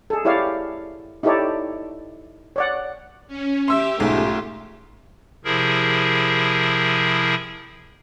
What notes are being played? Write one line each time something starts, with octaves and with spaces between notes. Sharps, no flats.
G#4 A4
E4 G4 C#5 D5 F5
D#4 E4 G4 A4 C#5 D5
C#5 D5 F#5
C#4
G4 E5 C6 E6
B1 G#2 A3 F4
C3 F3 E4 G#4 A#4